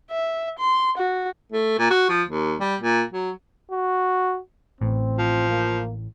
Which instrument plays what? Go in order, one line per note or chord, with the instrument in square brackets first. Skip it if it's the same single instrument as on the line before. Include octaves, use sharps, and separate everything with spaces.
[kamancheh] E5
C6
F#4
[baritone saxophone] A3
A#2
F#4
F3
D#2
G3
A#2
F#3
[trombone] F#4
[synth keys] A1 A2 [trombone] C4
[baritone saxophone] F3
[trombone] A#3